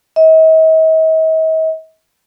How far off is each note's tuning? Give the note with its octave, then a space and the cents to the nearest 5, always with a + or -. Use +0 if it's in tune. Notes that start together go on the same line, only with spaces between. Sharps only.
D#5 +45